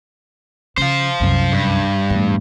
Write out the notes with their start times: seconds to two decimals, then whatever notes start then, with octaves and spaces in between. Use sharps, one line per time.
0.77 C#3 C5 F5
1.20 C2 F#2
1.53 G2
2.10 E2 A2